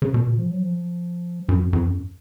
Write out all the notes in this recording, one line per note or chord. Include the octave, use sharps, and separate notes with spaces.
C#3
B2
A#2
F3
F#3
F3
F#2
F2
F2
F#2